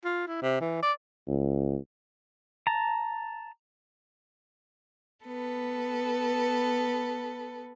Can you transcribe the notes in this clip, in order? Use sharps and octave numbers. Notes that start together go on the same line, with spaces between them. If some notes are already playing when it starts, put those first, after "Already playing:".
F4
E4
C3
E3
D5
C#2
A5 A#5
B3 A4 B4